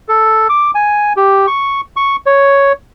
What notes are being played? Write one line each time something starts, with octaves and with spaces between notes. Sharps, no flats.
A4
D6
G#5
G4
C#6
C#6
C#5